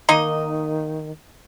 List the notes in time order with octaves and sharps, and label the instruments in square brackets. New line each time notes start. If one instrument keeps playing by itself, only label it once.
[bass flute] D#3 [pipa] A#3 D#4 D#5